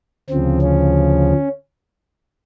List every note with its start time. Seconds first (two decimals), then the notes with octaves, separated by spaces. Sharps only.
0.29 D2 C#3 F3 C4
0.61 C#4